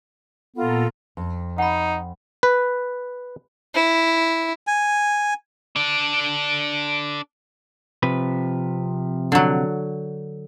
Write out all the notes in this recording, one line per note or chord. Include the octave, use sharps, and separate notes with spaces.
A#2 B3 F4 A4 A#5
F2
D#4 F#5 B5
B4
E4
G#5
D4 A4
C3 F3 B4
D3 F#3